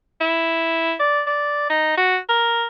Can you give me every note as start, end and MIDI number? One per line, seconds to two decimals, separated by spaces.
0.21 0.94 64
1.00 1.22 74
1.27 1.69 74
1.70 1.93 63
1.97 2.18 66
2.29 2.66 70